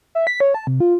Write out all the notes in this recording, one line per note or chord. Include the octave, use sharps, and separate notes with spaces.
E5
B6
C#5
A5
C3
F4